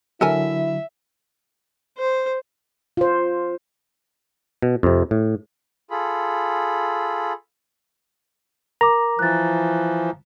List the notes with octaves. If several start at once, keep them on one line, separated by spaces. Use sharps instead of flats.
D3 F#3 E4 A4 A#4 E5 G#5
C5
F4 C5
B2
F2 C3
A2
F4 G#4 A4 B5
A#4 A#5 D6
E3 F3 F#6 A6